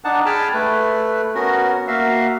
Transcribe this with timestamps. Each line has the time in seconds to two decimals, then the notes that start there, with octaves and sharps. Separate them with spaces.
0.04 D4 D#4 F#5 A5
0.26 G#4 G5 A5 B5 F6
0.54 A3 B4
1.35 B3 C#4 F#4 A#4
1.87 A#3 F#4 E5 F5